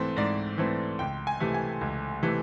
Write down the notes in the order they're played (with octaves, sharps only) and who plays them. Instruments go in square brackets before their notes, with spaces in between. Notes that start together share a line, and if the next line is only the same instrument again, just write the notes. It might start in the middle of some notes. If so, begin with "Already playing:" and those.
Already playing: [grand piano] G#2 E3 A3 C4
G#2 D5
E3 A3 C4
C#2 G5
G#5
C3 E3 A3
G#5
C#2
C3 E3 A3